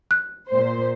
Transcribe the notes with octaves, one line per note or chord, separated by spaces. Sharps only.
F#6
A#2 C5